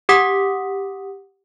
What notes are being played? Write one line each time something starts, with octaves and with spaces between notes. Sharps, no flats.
G4 F#5 D6 D#6 B6